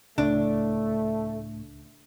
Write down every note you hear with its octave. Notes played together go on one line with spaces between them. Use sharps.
C#2 A2 A3 D4